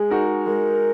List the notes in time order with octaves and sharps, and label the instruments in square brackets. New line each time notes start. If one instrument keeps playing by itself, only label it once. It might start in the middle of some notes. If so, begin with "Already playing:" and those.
Already playing: [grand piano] G#3 [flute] G#4
[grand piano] D#4 F#4 A#4
[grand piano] G#3 [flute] A#4